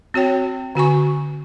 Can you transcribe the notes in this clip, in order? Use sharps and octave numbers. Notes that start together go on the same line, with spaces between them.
C4 F#4 C#5 G5
D3 F#4 G#5 C#6